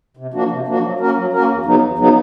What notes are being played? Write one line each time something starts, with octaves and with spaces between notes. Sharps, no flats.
C3
F3 A#3 D4 F#4
C3
F3 A#3 D4 F#4
F#3
A#3 C#4 F#4 A#4
F#3
A#3 C#4 F#4 A#4
E2
C#3 F#3 B3 D#4
E2
C#3 F#3 B3 D#4